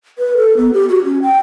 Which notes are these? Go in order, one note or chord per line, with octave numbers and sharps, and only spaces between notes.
B4
A4
B3
G4
F#4
C#4
G5